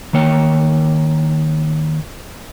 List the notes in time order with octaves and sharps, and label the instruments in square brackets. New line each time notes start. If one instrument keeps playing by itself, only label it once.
[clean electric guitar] D#3 A#3 C#5 G5